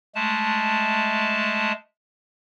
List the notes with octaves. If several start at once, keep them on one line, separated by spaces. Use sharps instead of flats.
G#3 A3 A5